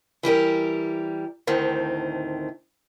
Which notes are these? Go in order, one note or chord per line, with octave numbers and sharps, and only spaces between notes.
E3 G3 G4 A#4
D2 A2 D#3 C4